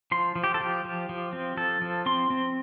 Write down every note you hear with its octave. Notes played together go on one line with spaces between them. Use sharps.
F3 C6
F3
G4
A4
F3 G4
F3
F3
C4
F3 A4
F3
C4 C6
C4